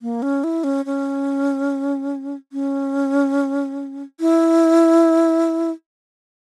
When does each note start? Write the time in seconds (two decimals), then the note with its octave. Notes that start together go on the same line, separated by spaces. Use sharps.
0.02 A#3
0.22 C#4
0.44 E4
0.64 C#4
0.85 C#4
2.53 C#4
4.20 E4